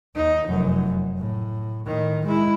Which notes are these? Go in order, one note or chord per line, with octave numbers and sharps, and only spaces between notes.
D#2 D#4
F1 F#2
A2
A2 D#3
G#3 E4